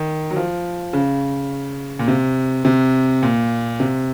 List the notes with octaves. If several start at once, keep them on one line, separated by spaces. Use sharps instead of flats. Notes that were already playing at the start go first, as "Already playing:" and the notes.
Already playing: D#3
F#3
F3
C#3
A#2
C3
C3
A#2
C3